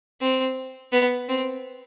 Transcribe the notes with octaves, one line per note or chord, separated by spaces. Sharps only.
C4
B3
C4